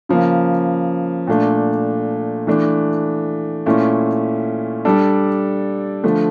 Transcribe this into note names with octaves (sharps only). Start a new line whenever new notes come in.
C#3 F3 A#3
A#2 A3 D4
E3 A3 D4
A#2 A3 C#4 E4
G3 D4 A4
D3 F3 A3